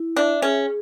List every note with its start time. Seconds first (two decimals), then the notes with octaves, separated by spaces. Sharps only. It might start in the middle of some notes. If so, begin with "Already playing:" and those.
Already playing: E4
0.17 D4 E5
0.42 C#4 G#4